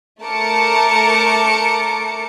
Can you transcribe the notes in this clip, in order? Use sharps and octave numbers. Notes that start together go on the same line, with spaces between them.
A3 A#4 A5 D6 C#7